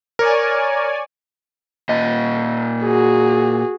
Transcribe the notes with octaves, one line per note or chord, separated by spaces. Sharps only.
A#4 C#5 D5 G#5
A#2 D#5
F#4 G#4